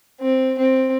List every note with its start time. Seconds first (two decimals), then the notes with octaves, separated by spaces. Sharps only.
0.21 C4
0.58 C4